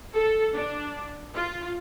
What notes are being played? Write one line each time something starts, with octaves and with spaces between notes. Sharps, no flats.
A4
D4
F4